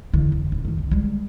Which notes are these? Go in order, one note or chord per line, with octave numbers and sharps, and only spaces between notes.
E2 D3
F1
D#1
F1 D#3
C2
G3 G#3